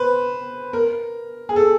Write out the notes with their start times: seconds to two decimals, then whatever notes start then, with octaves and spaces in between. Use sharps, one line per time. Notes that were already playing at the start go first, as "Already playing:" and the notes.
Already playing: B4 C5
0.73 A#4
1.49 G#4
1.56 A4